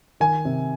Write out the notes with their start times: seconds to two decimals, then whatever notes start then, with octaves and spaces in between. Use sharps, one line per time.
0.20 D#3 G#5
0.45 C3